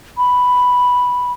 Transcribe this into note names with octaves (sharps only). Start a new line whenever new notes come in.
B5